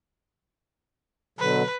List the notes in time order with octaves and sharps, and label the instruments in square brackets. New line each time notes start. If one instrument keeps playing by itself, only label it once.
[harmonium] B2 D3 F#3 [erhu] B4